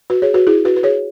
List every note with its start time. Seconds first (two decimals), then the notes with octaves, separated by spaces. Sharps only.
0.10 F#4 B4
0.22 G#4 C#5
0.34 F#4 B4
0.47 E4 G#4
0.65 F#4 B4
0.76 B4
0.83 G#4 C#5